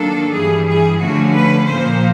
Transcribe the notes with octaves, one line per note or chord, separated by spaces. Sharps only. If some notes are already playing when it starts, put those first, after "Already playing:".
Already playing: D#3 F#3 A#3 D4 A4
G2 E3 G3 G#4
G#4
D3 F3 A3 C#4 F#4
B4
A#2 F3 A#3 C5